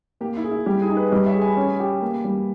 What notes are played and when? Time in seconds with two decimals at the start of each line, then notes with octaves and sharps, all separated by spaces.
0.21 A#3 G4
0.37 E4
0.44 G#4
0.51 E4
0.66 G3 G4
0.82 E4 G#4
0.89 D#4
0.97 G#4 B4
1.11 G3 B4 D#5
1.26 C#5 E5
1.34 G#4
1.41 G#5 B5
1.57 C#4
1.80 G4
2.02 A#3
2.25 G3